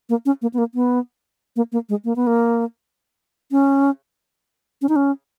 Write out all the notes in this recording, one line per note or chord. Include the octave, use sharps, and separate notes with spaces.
A#3
C#4
A#3
B3
A#3
B3
A#3
A#3
G#3
A#3
B3
A#3
C#4
C#4
D#4
C#4